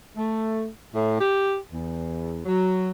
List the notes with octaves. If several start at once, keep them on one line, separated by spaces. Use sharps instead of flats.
A3
A2
G4
E2
F#3